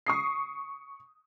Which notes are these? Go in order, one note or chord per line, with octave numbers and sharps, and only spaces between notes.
C#6 D#6 C7